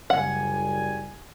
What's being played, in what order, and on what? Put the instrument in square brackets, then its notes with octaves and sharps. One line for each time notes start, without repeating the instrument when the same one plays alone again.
[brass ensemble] F#1 G3 G#5 [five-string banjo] F#5